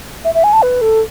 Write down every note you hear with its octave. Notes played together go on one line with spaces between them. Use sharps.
E5
E5
G#5
A5
B4
A4